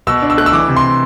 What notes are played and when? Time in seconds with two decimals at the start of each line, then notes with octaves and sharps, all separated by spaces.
0.07 B2 E6
0.22 D4
0.30 E6
0.38 A3 F#6
0.46 E6
0.53 E3 D6
0.68 C3
0.76 C6